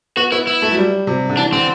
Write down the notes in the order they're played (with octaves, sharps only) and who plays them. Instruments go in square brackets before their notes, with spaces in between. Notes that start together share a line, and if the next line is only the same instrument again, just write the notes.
[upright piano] B3 [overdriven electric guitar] F#4
[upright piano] B3 [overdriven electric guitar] E4
[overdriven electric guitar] E4
[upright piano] A3
F#3
G3
C3
D3
[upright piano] E3 [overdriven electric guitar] D4
[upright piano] D3 [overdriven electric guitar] C4